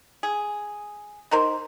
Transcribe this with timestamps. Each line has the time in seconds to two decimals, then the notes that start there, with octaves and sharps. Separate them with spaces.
0.23 G#4
1.31 D#4 A#4 C5